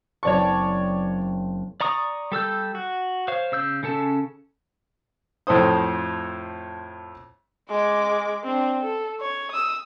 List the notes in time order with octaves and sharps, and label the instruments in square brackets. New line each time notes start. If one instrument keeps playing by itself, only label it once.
[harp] F#1 C4 A5 [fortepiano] C#5 D5 C#6
[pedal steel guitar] D5 A#5 C#6 D#6
G3 A4 E6 G6
F#4
C5 C#5 F5
C#3 E6 G6
C#3 C#4 A4 A5
[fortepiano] F2 A2 A4 C5 D#6
[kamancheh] G#3 D6
C4 D4
A4
C#5
D#6 E6